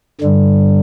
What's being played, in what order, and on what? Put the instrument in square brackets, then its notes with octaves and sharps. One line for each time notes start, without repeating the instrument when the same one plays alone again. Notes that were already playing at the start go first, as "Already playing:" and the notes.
[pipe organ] G2 D3 G3